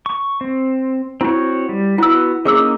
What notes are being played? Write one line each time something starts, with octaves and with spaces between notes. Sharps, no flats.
C#6
C4
C4 E4 F#4 C#5
G3
B3 E4 F#4 E6
A#3 C#4 D#4 G#4 D6 E6